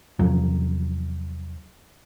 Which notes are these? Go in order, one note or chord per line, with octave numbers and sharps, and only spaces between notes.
E2 C3 F3 F#3